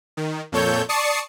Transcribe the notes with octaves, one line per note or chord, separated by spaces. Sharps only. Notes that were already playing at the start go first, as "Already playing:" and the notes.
D#3
F2 A#2 A4 C#5 G6
D5 A5 C#6 D#6 C7 C#7